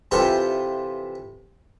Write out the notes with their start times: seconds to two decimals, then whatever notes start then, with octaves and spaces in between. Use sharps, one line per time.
0.11 C3 E3 F4 A4 F5 G5